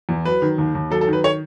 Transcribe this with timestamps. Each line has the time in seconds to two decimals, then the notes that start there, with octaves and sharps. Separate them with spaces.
0.09 E2
0.25 F#3 B4
0.42 D#3
0.58 D#2
0.75 D#2
0.90 F#3 A4
1.01 A4
1.08 D#3
1.13 B4
1.24 C#5